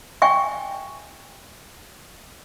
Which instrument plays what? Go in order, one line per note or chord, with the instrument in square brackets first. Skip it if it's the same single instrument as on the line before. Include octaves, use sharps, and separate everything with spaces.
[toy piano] G5 G#5 C#6